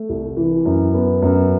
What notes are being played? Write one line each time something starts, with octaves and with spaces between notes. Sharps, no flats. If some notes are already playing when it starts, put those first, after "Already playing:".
Already playing: A3
C2
E3
F#2
B3
F#2